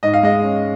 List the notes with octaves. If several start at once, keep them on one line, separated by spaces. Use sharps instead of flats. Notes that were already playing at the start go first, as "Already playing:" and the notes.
G#2 D#5
F5
G#3 D#5
C#4